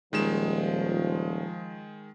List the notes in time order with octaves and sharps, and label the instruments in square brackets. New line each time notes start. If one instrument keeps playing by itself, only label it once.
[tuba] D#1 [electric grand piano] D#3 G#3 E7 [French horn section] F3